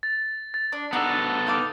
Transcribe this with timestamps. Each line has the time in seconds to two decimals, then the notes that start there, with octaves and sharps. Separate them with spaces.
0.03 A6
0.54 A6
0.72 D4
0.93 B3 D4 D#4 F#4 A4
1.47 D#4 F5 D6